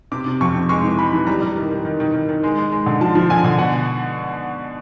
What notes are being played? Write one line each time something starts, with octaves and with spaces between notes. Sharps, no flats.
C3 D6
C3
F2 C#6
C3
G#3 C#6
E3
G#3 B5
E3
G3 A#5
G3
D#3
D#3
D#3
D#3
D#3
D#3
G#3
G#3
G#3
D3
F3 A5
F3
D3 G#5
D3
B2 F#5